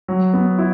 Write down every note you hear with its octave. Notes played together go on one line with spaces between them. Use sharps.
F#3
B3
E4